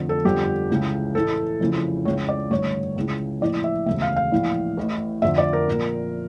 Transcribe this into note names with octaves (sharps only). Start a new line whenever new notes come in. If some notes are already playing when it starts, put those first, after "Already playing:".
Already playing: F1 F2 D3
A4
G1 F2 D3 G4
C#2 C#3 E3
A1 A2 E3 A4
F1 F2 C#3 E3
C#2 C#3 E3 C#5
D5
A1 G2 D3 C#5
C#2 C#3 E3
A#1 A2 E3 D5
E5
E1 D2 C#3 E5
F5
F5
A#1 A2 E3
A1 A2 E3
F1 F2 D3 E5
D5
A#4
A#1 A#2